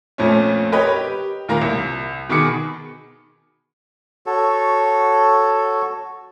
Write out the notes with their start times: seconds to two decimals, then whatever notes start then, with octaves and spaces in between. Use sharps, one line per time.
0.18 F2 A#2 A3 C#4
0.72 G4 A#4 B4 C#5 D#5 G5
0.96 G4
1.48 D#2 A#2 A#3 A#4 A#5
1.62 C2
2.29 B2 D#3 G#4 B5 D6 C#7
4.26 F#4 A4 C#5